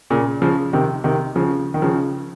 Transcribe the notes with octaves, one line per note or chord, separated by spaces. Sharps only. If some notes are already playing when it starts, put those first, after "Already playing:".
A#2 C#3
C#3 F3
C3 D#3
C3 D#3
C#3 F3
D#3
C#3 F3